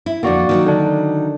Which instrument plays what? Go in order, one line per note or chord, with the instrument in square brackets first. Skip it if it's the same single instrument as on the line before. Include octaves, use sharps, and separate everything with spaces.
[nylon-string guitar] E4
[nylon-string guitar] F2 D3 [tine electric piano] A#3 F#4 D5
[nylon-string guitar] D#3 E3 F#3
[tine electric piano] D3 D4